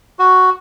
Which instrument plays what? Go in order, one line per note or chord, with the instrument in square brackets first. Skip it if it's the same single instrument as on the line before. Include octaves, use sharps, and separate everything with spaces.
[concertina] F#4